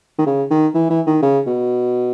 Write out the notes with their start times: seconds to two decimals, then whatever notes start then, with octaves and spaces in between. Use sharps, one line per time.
0.19 D#3
0.26 C#3
0.51 D#3
0.74 E3
0.90 E3
1.07 D#3
1.22 C#3
1.46 B2